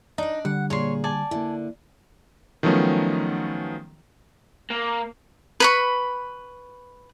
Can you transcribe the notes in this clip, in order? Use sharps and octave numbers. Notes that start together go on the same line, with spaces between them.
D4 D#4 D5 D#5
D3 G3 F#5
A#2 G#4 C#5 C6
D5 G#5 A5
D3 A#3 E4
D#3 F3 F#3 A3 B3 C#4
A#3
B4 B5 C#6